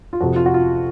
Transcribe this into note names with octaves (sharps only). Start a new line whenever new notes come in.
F4
F2 C3 F3 F#4
F4
F#4
F4